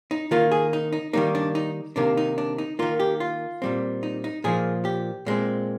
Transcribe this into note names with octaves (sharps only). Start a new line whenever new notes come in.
D#4
D#3 A#3 F4
G#4
D#4
D#4
D#3 G3 A#3 D#4
D4
D#4
C3 D#3 A#3 D4
D#4
D4
D#4
D#3 A#3 F4
G4
F4
A#2 G3 C4
D#4
D#4
A#2 F3 A#3 G#4
G4
A#2 G#3 C4